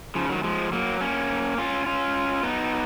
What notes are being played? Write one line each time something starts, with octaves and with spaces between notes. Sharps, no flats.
C#3 F3
D#3 F#3
F3 G#3
F#3 A#3
A#3 C#4
C#4 F4
C#4 F4
B3 D#4